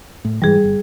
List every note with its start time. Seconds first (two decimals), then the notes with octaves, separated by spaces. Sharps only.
0.25 A2
0.42 G#2 B2 E3 G3 G#4
0.64 G1